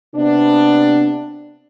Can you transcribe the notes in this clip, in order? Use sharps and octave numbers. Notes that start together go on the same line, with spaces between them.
C3 B3 D4